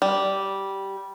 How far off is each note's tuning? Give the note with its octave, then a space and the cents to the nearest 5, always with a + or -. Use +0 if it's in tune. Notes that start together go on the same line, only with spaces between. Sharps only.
G3 -10